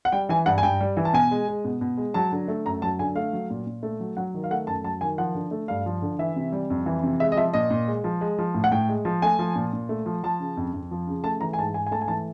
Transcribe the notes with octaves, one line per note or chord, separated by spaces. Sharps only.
F#5
G3 G5
E3 G#5
G2 F#5
G#5
G2 G5
G3
E3
A5
B2 G#5
G#3
G#3
B2
B2
G#3
F#3 A5
D3
A3
F#2 A#5
F#3 A5
D3 G#5
A3 F5
F#3
A#2
A#2
A3
F#3
F#3 F#5
D#3
F5
A3 F#5
F#2 A5
F#3 A5
D#3 G#5
F3 F#5
D3
A3
G2 F5
F3
D3
E3 E5
C3
G3
F2
E3
C3
G#3 E5
D#5
F3 E5
A#2 D#5
A#2
G#3
F3
G#3
F3
A2
F#5
A2 G5
G#3
F3
A3 G#5
F3
A#2
A#2
A3
F3
F3 A5
C#3
F2
F2
F3
C#3
A3 A5
E3 A#5
G#5
G#2 A5
G#2 G#5
G#5
A3 A5
G#5
E3 A5